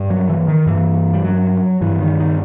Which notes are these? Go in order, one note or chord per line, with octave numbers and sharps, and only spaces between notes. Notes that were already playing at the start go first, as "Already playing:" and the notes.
Already playing: G2
F#3
E3
D#3
G2 E3
G3
F#3
G2 E3
D#3
D#3